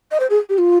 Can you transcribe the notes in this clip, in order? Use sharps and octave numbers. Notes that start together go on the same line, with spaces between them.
D#5
C5
G#4
G4
F4